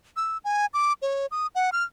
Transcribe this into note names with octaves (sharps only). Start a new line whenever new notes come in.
E6
G#5
D6
C#5
D#6
F#5
F6